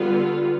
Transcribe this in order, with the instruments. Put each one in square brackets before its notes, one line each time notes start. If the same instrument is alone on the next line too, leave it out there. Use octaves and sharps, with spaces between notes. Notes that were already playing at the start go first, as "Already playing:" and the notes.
Already playing: [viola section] D3 G3 B3 F4